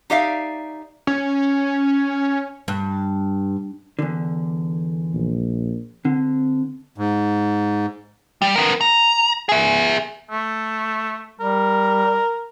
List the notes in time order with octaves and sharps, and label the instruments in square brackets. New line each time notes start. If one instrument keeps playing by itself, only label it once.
[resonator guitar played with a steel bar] D#4 G4 D5 E5 F5
[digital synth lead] C#4
[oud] G2
[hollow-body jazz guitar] E2 D3
[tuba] A#1
[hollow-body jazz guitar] D3 [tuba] C4
[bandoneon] G#2
[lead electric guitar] G3
B3 A#4
A#5
G#4 E5
[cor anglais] A3
[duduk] G3 [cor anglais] A#4